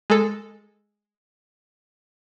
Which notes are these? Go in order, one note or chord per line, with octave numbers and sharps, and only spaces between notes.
G#3 A4